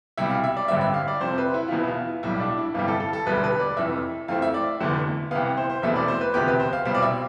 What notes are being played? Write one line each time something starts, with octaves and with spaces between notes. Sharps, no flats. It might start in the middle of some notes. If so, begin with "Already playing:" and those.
C2 B2 G3 E5
F5
E5
D5
A1 G2 D3 G3 C4 E5
E5
F5
D5
F2 C3 F3 C5
B4
E4
F4
E2 B2 B3 E4
E4
F4
B1 A2 G3 E4
D4
E4
G1 F2 C3 E3 G3 F4
A4
A4
A4
E1 D2 D3 G3 B4
B4
D5
F1 F2 E3 E5
F2 E3 A3 C4 F5
E5
D5
F1 E2 D3 A3
C2 C3 E3 B3 F5
C5
C5
E1 E2 B2 A3 C4 E5
D5
C5
B4
E1 D2 C3 F3 B3 G4
B4
C5
F5
C2 B2 G3 C4 F5
D5
E5